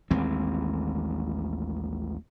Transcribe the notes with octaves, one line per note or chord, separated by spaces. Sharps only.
A1 D#2 G#3 C4